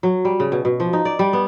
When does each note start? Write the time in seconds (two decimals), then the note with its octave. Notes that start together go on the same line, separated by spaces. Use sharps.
0.03 F#3
0.25 G3
0.40 C#3
0.52 B2
0.65 B2
0.80 F3
0.93 D#4
1.05 D5
1.19 G3
1.33 B3